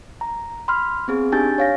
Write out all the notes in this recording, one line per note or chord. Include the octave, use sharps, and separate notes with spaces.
A#5
B5 C6 F6
B3 C4 G#4
D4 D#4 G4 G#5 G6 A6
C#5 F5 A#6